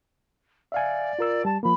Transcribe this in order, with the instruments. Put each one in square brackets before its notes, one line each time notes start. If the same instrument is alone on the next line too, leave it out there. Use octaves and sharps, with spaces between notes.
[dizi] D5 [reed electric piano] E5 F5 G#5
[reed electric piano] F4 A#4 E6
[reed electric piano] G3 [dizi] A5
[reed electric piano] F3 A#3 [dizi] B5